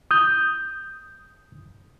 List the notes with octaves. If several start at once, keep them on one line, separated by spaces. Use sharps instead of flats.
D#6 G6